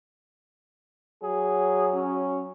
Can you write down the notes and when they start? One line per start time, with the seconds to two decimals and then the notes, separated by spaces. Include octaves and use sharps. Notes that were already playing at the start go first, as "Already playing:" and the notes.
1.23 F#3 G#4
1.95 C#4